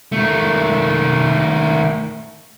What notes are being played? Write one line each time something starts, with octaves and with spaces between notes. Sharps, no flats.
D#3 A3